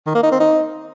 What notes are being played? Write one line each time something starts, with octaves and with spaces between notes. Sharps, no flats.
D#3
A#3
D#4
C4
D#4